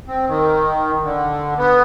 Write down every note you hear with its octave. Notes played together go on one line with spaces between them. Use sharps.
C4
D#3
D3
B3